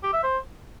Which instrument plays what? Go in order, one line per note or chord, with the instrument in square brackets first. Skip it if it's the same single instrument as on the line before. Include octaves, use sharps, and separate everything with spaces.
[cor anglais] G4
E5
C5